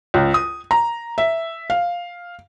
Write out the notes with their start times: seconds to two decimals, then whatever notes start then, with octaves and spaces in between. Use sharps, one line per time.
0.14 C#2
0.34 D#6
0.71 A#5
1.18 E5
1.70 F5